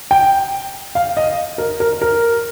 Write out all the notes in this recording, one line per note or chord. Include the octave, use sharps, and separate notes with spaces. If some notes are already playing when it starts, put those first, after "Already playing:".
G5
F5
D#5
A#4
A#4
A#4